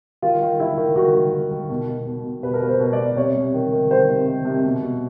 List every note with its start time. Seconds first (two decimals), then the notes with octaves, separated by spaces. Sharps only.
0.22 D#3 F4
0.41 D#3
0.60 D#3 E4
0.77 D#3
0.96 D#3 F#4
1.15 D#3
1.33 D#3
1.51 D#3
1.69 B2
1.88 B2
2.07 B2
2.25 B2
2.43 B2 B4
2.54 A#4
2.61 B2 B4
2.68 C5
2.80 B2
2.93 D5
2.98 B2
3.16 C3 C#5
3.35 C3
3.54 D#3
3.72 D#3
3.90 D#3 C5
4.09 C3
4.27 D#3
4.45 C3
4.64 B2
4.83 B2